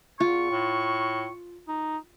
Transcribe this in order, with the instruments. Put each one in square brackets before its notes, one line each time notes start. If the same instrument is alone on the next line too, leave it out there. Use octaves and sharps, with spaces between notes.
[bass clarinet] E2 [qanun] F4 [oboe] C#6
[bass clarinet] A2
D#4